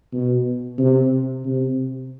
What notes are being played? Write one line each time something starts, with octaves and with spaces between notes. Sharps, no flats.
B2
C3
C3